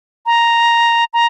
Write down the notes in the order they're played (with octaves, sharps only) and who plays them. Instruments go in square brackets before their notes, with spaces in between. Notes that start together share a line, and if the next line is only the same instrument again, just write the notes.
[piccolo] A#5
A#5